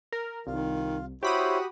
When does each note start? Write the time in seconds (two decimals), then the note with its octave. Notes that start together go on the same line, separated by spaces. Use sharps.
0.13 A#4
0.47 C2 D#3 F4
1.23 E4 F#4 G4 C5 C#5 B5 D#6